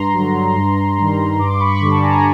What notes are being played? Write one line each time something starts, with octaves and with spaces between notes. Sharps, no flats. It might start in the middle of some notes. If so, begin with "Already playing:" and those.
Already playing: G2 A#5 C6
D3 F#3
G2
D#3 G3
G2 C6 D6
B5 C#6
D3 G3
A5
G#5 A#5